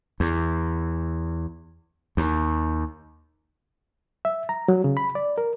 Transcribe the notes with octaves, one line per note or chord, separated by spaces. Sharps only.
E2
D#2
E5
A#5
F#3
C#3
B5
D5
A#4